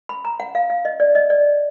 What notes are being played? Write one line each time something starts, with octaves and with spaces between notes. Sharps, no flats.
B5
A#5
F#5
F5
F5
D#5
D5
D#5
D5